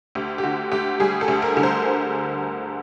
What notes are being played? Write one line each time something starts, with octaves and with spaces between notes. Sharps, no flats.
D2 G4
G4
D3 F#4
D2 G4
G3 G#4
A4
D2
A#4
D3
C5